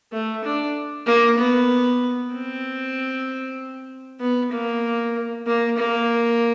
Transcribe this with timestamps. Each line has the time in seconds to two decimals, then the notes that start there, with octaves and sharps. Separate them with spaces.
0.12 A3
0.44 D4
1.07 A#3
1.39 B3
2.33 C4
4.21 B3
4.52 A#3
5.47 A#3
5.78 A#3